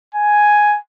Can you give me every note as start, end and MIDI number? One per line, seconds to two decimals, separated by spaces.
0.15 0.77 80